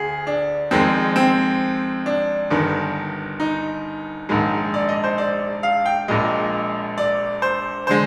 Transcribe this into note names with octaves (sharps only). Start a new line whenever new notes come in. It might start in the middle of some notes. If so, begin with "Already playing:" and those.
Already playing: D2 G#4
D4
F2 D#3 G#3 C4
C4
D4
G1 G2 D#3
D#4
A#1 G#2 D#3 G#3
D5
D#5
C5
D5
F5
G5
A#1 A#2 G#3 D#5
D5
C5
D3 G#3 C5